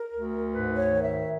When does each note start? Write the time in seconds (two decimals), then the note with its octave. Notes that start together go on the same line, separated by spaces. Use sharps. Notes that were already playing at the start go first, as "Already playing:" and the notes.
Already playing: A#4
0.13 D2
0.52 G#2 B4
0.78 C#5
0.91 D#3
1.03 E5